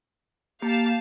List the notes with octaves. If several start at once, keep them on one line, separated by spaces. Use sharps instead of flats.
A#3 G4 F5 A5